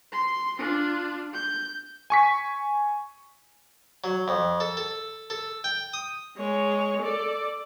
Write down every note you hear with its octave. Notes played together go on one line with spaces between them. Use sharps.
C6
D4 F4
G6
G#5 C#6 B6
F#3
F2
A4
A4
A4
G5
D#6
G#3 C#5
A4 D5